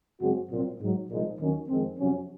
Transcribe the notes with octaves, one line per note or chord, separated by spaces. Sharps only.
F#2 C#3 G#3 C4 F#4
C2 A#2 F#3 C4 F4
G#2 D#3 F#3
C2 A#2 F3 G#3 D#4
D#2 D#3 F#3 C#4
F2 D#3 G#3 C4
F2 C3 F#3 C#4